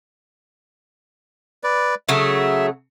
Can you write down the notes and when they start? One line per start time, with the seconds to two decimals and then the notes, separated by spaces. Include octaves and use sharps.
1.64 B4 D5
2.09 C#3 F#3 A3 E5